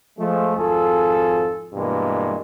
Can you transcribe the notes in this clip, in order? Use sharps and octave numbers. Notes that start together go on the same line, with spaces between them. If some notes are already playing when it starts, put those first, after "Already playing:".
F3 G#3 A3
G#1 F2 F4 G#4 A4
G2 B2 E3 G3 G#3 A#3